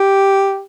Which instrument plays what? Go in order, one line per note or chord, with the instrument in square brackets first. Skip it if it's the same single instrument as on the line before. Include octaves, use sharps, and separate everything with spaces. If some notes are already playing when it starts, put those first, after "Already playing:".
Already playing: [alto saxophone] G4